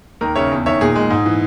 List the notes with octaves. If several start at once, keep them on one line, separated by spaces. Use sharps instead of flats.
D#2 A#4
C#3 C#5 E5
E2
D#3 C#5 E5
A#2 G#4
G#3
G#2
E3